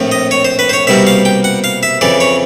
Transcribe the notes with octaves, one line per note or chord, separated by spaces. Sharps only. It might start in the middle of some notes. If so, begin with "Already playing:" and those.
Already playing: A#1 A2 F3 A3 C4
D#5
C#5
C5
B4
C5
C#5
C2 B2 G3 A#3 E5
F5
G5
F#5
F5
E5
F2 C#3 E3 D5
C#5